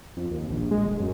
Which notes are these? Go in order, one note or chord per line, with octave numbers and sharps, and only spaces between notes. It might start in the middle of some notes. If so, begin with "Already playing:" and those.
F2
D#2
A#1
G#3
D1
F#2